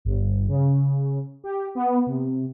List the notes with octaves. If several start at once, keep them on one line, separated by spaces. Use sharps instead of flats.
G1
C#3
G4
B3
C3